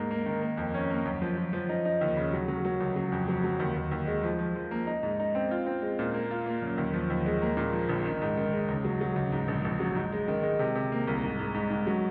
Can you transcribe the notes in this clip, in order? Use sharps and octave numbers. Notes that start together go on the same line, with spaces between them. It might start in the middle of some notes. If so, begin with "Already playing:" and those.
Already playing: G#2 A#3
A#3
D#3
A#3
F2
C#4
A#3
F#2
F3
F3
F3
D#4
D#4
D#2
C#3
F#3
F#3
F#3
C#2
F#3
F2
F#3
F#3
D#2
D#2
D#2
G#3
F3
F3
F3
A#3
D#4
G#2
D#4
C4
F4
C4
G#3
A#2
A#3
F4
A#3
F#2
D#2
F3
D#2
G#3
A#3
A#2
F3
A#1
D#3
G#2
D#3
G#3
C#2
F#3
F#3
C#2
G#2
A#1
A#1
F#3
G#2
G#3
D#3
G#3
C3
C3
A#3
C2
G#2
G#2
G#2
G#2
F#3